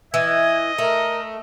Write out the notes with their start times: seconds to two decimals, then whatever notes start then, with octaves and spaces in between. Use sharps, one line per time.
0.14 E3 D#5 G#6
0.78 A3 A#4